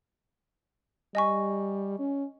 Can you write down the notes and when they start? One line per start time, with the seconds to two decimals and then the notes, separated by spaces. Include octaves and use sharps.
1.15 G3 D#5 G#5 C#6
1.99 C#4